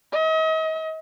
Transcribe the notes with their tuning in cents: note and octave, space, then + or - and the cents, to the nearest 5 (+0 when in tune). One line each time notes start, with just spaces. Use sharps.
D#5 +40